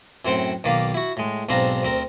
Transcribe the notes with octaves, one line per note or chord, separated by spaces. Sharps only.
F#2 A2 C4 C5 F#5 G5
B1 D#3 A#3 D5 F5
E4 F#4
A2 G#3
B1 G#2 C4 D4 F5 A#5
D2 C4 A#4